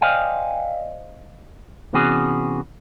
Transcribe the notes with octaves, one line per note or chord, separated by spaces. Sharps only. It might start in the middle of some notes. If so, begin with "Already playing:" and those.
C5 D5 D#5 F5 G5 G#5
C3 E3 B3 C#4 F#4 G#4